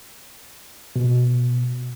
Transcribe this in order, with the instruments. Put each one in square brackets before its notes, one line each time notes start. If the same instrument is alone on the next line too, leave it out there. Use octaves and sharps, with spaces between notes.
[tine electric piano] B2